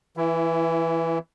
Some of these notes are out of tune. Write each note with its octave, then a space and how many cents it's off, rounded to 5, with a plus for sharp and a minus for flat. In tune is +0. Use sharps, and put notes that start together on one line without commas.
E3 +0 E4 +25